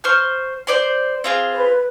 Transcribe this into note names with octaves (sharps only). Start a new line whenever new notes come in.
C5 C#6 F6
C5 D5 C6
C4 F4 G#4
B4